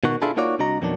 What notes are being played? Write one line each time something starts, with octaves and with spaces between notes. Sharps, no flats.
B2 D#3 F#4
D4 E4 F4 G#4 A4
A#3 D#4 F4 F#4 C#5 D5
C2 D4 F#4 D#5 A#5
F2 B2 D#3 F#3 D4